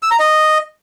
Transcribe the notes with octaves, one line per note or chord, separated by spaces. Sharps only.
E6
A#5
D#5